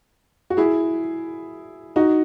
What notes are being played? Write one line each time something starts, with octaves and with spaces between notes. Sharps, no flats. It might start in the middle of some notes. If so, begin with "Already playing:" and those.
F#4
E4 G#4
D#4 F#4